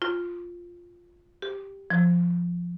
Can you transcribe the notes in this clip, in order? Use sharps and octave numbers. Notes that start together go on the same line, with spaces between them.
F4
G4
F3